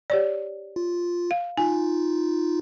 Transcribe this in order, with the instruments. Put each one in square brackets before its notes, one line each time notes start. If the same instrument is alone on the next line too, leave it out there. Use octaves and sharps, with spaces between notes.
[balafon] G4 C#5 D5
[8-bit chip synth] F4
[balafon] F5
[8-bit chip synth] D#4 F4 [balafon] G#5